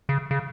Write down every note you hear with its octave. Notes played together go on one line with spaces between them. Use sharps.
C#3
C#3